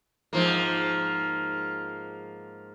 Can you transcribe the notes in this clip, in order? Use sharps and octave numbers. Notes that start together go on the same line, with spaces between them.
G#2 F3 A#3